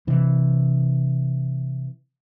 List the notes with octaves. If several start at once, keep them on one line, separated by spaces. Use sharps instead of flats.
C3 E3